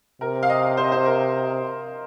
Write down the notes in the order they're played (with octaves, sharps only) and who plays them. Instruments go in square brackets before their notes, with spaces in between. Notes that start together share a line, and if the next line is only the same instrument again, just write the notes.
[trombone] C3 [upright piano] A#4
[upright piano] F5
D#5
C5
D#5
C5
A#4